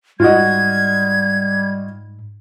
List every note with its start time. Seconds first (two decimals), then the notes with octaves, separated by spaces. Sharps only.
0.20 G#2 G3 F4 F#4 D#5 G#6